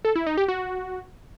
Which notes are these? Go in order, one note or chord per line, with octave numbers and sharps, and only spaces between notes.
A4
E4
D#4
G4
F#4